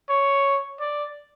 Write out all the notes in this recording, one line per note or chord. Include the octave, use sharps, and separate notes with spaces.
C#5
D5